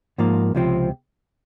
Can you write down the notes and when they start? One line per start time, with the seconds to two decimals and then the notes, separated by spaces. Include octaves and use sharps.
0.18 G#2 F3 A#3
0.55 C#2 C3 F3 C4